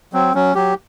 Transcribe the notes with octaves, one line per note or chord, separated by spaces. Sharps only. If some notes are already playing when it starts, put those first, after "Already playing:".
F#3 C4
F#3 C#4
F#3 G4